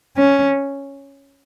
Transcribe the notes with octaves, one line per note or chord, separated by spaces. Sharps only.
C#4